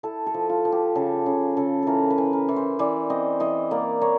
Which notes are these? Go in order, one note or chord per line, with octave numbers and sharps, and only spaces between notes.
E4 A4
A4
F3
F4
F3
G4
C#3 A4
C#3 G#4
C#3 A4
E3 A4 A#4
B4
E3
A#4
E3
C5
E3 D5
C4 D#5
E3 D#5
A#3 D5
A#3 C#5